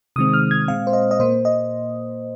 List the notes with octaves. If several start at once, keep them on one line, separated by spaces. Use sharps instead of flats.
C3 D#3 G#3 C4 D#6
F6
G#6
A#2 G#3 C4 F5
C5
D#5
D#5
A#2 A#3 C5
D#5